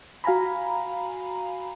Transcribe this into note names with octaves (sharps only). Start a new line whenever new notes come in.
F#4 F5 G#5 A#5 B5